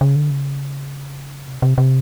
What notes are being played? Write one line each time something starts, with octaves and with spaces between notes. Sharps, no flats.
C#3
D3
C#3
C3
C3
C3